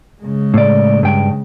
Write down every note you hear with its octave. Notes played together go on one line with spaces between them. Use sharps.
C#3 G#3
A2 D5
G2 G5